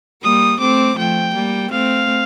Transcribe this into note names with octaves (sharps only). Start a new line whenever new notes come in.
G3 A#3 D#6
A3 C4 D6
F3 A3 G5
G3 A#3
A3 C4 F5